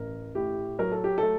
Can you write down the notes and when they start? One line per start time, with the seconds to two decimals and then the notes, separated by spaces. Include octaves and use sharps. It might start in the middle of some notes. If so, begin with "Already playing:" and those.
Already playing: A1 A#4
0.35 A2 G4
0.79 F#3 A#4
0.92 A4
1.04 G4
1.18 A3 A4